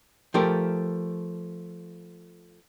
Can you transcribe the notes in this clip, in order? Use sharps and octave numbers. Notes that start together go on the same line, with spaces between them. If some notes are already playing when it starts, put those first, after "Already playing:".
F3 A3 G4 A#4